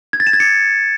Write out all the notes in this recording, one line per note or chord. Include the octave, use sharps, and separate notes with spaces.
G#6
A6
E7
G#6
C#7